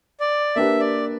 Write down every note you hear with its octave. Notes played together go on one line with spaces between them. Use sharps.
D5
A#3 D4 G4 B4 E5
D5